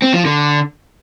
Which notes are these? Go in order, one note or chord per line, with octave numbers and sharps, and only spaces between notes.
C4
F3
D3